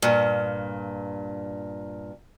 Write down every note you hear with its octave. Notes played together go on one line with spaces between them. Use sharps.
G2 A#2